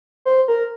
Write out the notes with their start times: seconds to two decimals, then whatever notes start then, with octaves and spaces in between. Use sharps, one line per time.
0.25 C5
0.48 A#4